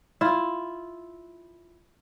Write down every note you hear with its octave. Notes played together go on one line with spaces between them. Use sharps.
E4 F4